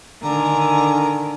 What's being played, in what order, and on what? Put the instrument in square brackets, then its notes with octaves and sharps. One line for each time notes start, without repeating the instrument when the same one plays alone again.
[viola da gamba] D3 D#3 [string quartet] G#5 [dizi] A#5